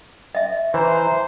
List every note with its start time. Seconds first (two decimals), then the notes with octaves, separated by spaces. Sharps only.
0.35 D#5 E5
0.74 E3 C5 A#5